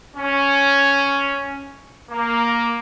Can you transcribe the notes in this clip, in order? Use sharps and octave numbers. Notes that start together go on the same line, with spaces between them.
C#4
A#3